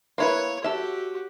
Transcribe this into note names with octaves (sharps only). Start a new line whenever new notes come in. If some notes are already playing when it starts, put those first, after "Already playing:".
A#3 E4 B4 C#5
F#4 G4 A4 E5